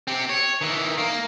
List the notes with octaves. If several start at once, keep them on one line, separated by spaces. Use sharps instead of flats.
C4 G4
C#5
D#3 E3
A#3